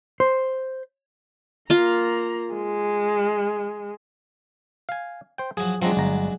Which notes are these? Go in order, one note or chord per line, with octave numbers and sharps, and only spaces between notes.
C5
A#3 F4 F5 A#5
G#3
F5 G#5
C5 G5
F3 F#3 G#4
F3 F#3 G#3 C4 D4 A#5
G1 A#5